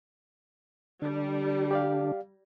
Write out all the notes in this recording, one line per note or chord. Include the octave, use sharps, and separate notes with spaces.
D3 G3 D4
G4 D5 F5